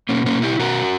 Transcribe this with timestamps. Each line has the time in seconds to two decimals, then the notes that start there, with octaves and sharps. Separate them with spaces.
0.09 B2 A#3 C#4
0.26 A#3 C#4
0.35 B2
0.42 E4 G4
0.59 B2 F#4 A#4